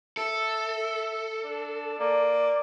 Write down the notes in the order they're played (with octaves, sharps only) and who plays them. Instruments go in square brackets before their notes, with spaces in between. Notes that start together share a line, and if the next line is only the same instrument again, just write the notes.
[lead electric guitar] A4 [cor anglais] E5
[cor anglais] D4
[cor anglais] A#3 [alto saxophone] D5